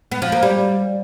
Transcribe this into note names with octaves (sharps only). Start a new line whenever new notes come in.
B3
F3
A#3
G3